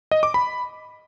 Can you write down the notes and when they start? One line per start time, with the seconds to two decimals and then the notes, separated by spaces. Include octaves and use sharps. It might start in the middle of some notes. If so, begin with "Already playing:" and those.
0.11 D#5
0.23 D6
0.34 B5